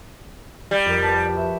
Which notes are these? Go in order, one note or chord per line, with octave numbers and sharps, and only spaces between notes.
G3
F2 A#4
G4 B4 A5
F#4 B4 E5